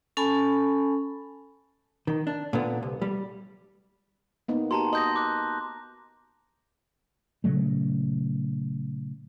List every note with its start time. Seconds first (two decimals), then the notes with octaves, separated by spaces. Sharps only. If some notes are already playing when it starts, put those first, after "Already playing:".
0.17 C#4 A4 G#5 A5 B5
2.07 D#3
2.27 D4
2.53 A#2 D3 B3
2.83 C2
3.02 G3
4.48 A#3 B3 D#4
4.71 F#4 G4 A5 A#5 C6
4.93 D#5 C6 G6 A#6
5.16 D6 F#6
7.44 A#2 C#3 F#3 A3